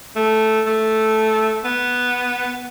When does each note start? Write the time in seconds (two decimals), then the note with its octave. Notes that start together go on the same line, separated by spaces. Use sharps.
0.16 A3
0.66 A3
1.64 B3